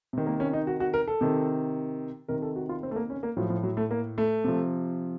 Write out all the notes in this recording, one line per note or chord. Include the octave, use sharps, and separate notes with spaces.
C3 D#3
A#3
C#4
D#4
F#4
F#4
A#4
A4
C3 D#3
C3 D#3 A#4
A4
F#4
F4
C4
A3
A#3
C#4
A#3
A2 F3 F#3
F3
F#3
A3
A#3
A3
C3 F3